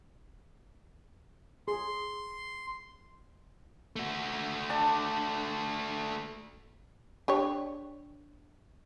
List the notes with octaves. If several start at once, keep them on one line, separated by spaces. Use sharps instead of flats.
G#4 C6
A3 F#4
D4 A5
D4 G4 C#5